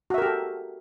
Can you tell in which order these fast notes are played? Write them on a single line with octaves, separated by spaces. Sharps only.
F#4 E5 A#4 G4 A4